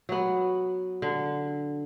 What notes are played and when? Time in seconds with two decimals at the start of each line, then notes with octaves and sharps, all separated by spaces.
0.09 F#3 B3
1.02 D3